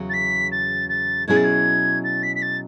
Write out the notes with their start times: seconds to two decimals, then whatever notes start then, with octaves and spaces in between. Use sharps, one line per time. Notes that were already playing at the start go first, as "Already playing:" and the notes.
Already playing: E2 C#3 F#3
0.09 A6
0.13 B6
0.52 A6
0.89 A6
1.28 B2 F#3 C#4 E4 G#4 G#6
1.36 A6
1.44 G#6
2.04 A6
2.23 B6
2.35 B6
2.42 A6